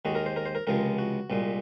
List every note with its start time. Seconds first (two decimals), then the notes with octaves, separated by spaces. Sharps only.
0.05 D#2 D#3 G#3 F#4
0.15 A#4
0.26 C5
0.36 A#4
0.46 C5
0.55 A#4
0.67 C#2 C3 F3 G#3 A#4
0.98 F#4
1.30 C2 A#2 G#3